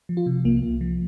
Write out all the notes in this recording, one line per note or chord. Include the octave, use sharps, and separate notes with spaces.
F3
F4
C3
C2 A#3
C2
F3